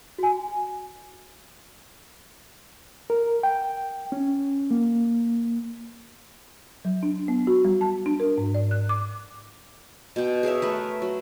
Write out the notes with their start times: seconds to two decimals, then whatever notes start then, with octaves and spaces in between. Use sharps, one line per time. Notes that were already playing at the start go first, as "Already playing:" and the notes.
0.18 F#4 G#5
3.10 A#4
3.43 G5
4.12 C#4
4.71 A#3
6.85 F#3
7.03 D4
7.28 B3
7.47 F#4
7.65 G3
7.81 A5
8.06 D4
8.20 A#4
8.38 G#2
8.54 D5
8.71 F#6
8.89 D6
10.16 B2 G5
10.43 G#4 A#4 C#5 E5
10.62 A3 A#4 B4
11.02 F#3